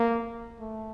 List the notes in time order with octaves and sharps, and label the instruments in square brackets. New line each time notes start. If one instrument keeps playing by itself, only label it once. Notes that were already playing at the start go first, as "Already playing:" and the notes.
Already playing: [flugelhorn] A#3
A3